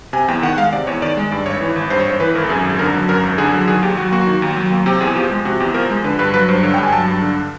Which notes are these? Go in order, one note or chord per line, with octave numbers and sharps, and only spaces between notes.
C3 G#5
E2 G5
D#3 F#5
F#5
G#3 F5
C3 D5
E2 C#5
D#3 D5
G#3
G2 D5
G#1 C#5
E3
G#1
G2 C5
C#5
G#1 C5
E3 B4
G#1 A#4
A4
F#2 G#4
G#1
D3 A#4
F#3
F#2 A#4
G#1
D3 G#4
F#3
D#3 G#4
D#2 G4
F#3 F#4
A#3 F#4
D#3
D#2
F#3
A#3
C3 G4
E2 G#4
F3 G4
G#3
C3 F#4
E2 G4
F3 A#4
G#3
D3 B4
G2 B4
F#3 B4
G2 C5
D3 C#5
G5
G2
G#5
F#3 A5
G2
D3